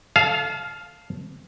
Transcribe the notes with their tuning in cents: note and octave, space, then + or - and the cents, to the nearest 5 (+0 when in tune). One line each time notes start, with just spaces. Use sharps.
A4 +0 F5 +0 A5 -40